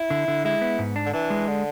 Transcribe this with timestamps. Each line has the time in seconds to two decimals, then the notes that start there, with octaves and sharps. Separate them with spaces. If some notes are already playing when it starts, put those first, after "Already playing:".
Already playing: E4
0.10 D3
0.28 D3
0.45 G#3 E4
0.61 B3
0.79 G#2
0.96 D4
1.06 D3
1.14 E3 D4
1.30 G#3
1.48 D3